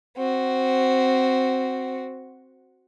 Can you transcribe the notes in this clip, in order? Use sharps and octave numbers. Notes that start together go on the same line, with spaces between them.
C4 F#4